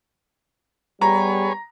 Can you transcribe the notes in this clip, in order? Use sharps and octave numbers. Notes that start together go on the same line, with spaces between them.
G3 B3 G#4 B4 C#5 A#5